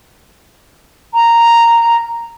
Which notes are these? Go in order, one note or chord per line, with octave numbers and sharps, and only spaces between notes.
A#5